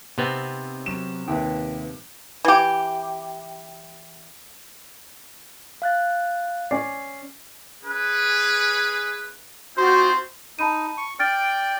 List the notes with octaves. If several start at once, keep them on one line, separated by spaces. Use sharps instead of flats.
C3 B3 C4 D#4
F#3 C#4 E7
D#2 B4 E5 G5
E3 G4
F5 F#6 A6
C#4 D5 C7
C#4 G#4 B4
C4 D#4 F4 F#4 C5
D#4 A5 B5 D#7
C#6
D5 G5 F6 A6 D7